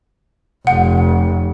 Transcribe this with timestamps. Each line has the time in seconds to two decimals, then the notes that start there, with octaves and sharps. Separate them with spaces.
0.67 F1 F#5